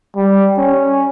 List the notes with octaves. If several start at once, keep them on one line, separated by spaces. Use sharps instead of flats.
G3
C#4